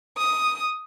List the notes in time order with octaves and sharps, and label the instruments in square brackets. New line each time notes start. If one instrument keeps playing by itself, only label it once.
[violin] D#6